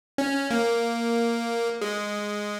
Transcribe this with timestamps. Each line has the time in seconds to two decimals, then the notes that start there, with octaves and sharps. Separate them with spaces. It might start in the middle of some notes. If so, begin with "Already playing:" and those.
0.18 C#4
0.51 A#3
1.81 G#3